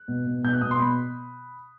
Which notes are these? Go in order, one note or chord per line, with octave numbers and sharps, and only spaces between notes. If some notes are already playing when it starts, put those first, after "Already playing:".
Already playing: F#6
B2
B2
B2 G6
F#6
B2 D#6
C6
B2 B5